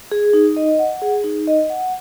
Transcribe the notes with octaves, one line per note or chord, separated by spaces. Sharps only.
G#4
D#4
D#5
F#5
G#4
D#4
D#5
F#5